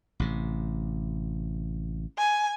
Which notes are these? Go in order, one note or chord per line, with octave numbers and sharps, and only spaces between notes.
A1 C3
G#5